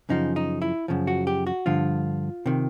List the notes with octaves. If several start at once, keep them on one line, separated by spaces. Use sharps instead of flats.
F#2 C#3 F3 D#4
D#4
E4
F#2 C#3 F3
F#4
G4
F#4
G2 D3 F3 F4
C3 D#3